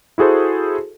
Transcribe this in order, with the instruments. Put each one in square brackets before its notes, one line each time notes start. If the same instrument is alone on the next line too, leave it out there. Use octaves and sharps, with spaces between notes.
[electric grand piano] E4 F#4 G#4 A4 C5